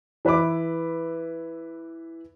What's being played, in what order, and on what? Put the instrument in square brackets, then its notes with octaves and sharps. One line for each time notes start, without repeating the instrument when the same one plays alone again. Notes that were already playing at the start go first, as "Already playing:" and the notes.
[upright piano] E3 B4 E5 B5 D6